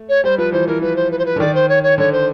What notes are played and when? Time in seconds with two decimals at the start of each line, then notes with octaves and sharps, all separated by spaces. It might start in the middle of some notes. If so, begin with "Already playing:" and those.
Already playing: A3
0.09 C#5
0.24 G3 C5
0.38 F3 B4
0.52 E3 C5
0.67 E3 A#4
0.81 F3 B4
0.96 C5
1.11 B4
1.19 C5
1.26 B4
1.36 D3
1.40 D#3 D5
1.54 C5
1.69 C#5
1.83 C#5
1.98 D3 C#5
2.12 C5